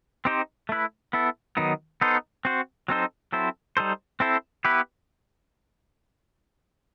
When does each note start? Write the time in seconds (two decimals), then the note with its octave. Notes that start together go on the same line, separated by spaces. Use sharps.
0.25 C4 D#4 G4 C5
0.69 A3 E4 B4
1.13 B3 E4 A4
1.57 D#3 F#3 B3 D#4
2.01 B3 D#4 A4 C5
2.45 C4 F#4 C5
2.88 F#3 C4 D#4 A4 C5
3.33 F#3 C4 E4 A4 C5
3.77 G3 D#4 A4 C5
4.20 C4 E4 A4 C5
4.65 B3 E4 G4 B4